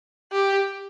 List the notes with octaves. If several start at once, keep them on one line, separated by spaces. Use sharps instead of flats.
G4